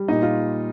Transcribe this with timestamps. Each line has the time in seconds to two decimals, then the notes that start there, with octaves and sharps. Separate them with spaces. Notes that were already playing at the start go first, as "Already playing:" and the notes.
Already playing: G3
0.08 A#2 D#4
0.22 F4